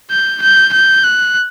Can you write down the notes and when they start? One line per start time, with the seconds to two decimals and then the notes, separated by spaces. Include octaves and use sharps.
0.10 G6
0.41 G6
0.73 G6
1.04 F#6